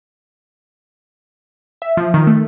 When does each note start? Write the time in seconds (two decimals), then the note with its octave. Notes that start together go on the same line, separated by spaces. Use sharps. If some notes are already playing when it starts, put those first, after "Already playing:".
1.82 E5
1.97 F3
2.14 D#3
2.27 A3